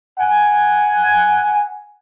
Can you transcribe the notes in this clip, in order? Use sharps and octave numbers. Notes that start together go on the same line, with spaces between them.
F#5 G#5